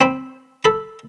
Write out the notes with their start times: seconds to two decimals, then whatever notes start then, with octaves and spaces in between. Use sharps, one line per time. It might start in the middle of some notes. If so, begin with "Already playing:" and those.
0.01 C4 B5
0.65 A4 B5